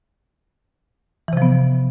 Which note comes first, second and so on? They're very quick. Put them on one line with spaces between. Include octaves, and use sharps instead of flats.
E3 C3 F3 B3